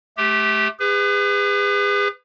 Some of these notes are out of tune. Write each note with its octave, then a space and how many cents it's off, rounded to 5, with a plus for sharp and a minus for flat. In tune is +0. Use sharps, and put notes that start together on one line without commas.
A3 -25 G4 +0
G#4 -40 B4 +25